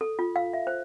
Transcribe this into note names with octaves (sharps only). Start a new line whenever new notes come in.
A4
F4
F5
E5
C5